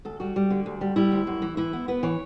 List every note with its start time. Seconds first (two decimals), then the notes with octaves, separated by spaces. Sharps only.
0.05 D2 A4
0.20 G3 F#4
0.36 G3
0.50 D3
0.66 D2
0.81 G3
0.96 G3 E4
1.12 D2
1.27 F#2
1.42 E3
1.57 E3 E4
1.73 B3
1.88 B3 B4
2.03 E3 C#5